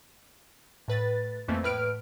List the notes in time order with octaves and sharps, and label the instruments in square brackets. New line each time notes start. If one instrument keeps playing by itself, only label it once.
[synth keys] A2 B4 A6
F2 E3 A3 A#3 C4
A2 B4 F6 D7